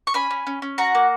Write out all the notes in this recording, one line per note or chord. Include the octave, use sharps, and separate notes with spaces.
C#6
C#4 G#5 B5
C#4
C#4
C#4
F#4 F#5 A#5
A#3